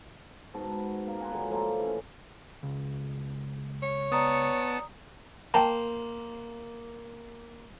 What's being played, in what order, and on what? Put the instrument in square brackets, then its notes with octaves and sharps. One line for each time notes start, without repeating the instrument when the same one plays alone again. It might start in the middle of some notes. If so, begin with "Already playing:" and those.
[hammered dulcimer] G#2 B3 F#4 A5
A#3 B3 D4 A#4
B4 F#5 G#5 C6
A#2 D3 F#3 G#3
F3 A3 A#3
E3 C#4
[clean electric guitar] C#2
[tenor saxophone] C#5
[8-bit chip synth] B3 A5 C#7 [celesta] D5 A#5 D#6
[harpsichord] A#3 C5 [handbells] G5 A5 A#5